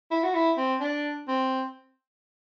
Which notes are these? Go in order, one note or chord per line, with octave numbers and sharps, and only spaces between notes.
E4
F#4
E4
C4
D4
C4